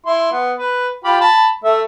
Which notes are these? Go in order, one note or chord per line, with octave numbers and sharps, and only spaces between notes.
E4 C6
B3
B4
F4 G4 B5
A5 B5
A3 E5